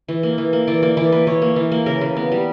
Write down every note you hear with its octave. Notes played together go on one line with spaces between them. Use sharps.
E3
A#3
E3
A#3
E3 D5
A#3 D5
E3 D5
A#3 B4
E3 C#5
A#3
E3
A#3
C#3 A#4
C#3
B3
G3